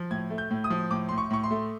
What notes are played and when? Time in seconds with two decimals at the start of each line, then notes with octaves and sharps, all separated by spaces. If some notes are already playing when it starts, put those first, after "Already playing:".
Already playing: F3
0.11 A2 G#6
0.30 A3
0.38 G6
0.51 A2
0.64 D#6
0.70 F3
0.91 A2 D6
1.09 A2 C6
1.18 C#6
1.30 A2 C#6
1.43 C6
1.51 A3